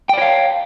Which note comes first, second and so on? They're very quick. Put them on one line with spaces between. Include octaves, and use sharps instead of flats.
G5 D5 C#5 F5